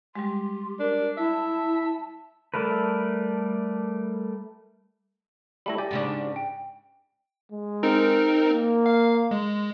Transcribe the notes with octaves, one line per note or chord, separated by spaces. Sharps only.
G3 G#3 G4 C6
D4 A#4
E4 E5 A5
G3 A3 A#4 B4
G3 A3 E4 B5 A#6
G4 D5 G#5
G#2 C#3 D4
G5
G#3
C4 D#4 A#4
A#3
F5
G#3